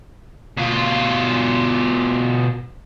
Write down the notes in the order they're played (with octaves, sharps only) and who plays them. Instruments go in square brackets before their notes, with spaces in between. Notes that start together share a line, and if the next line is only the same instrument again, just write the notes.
[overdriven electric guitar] B2 F4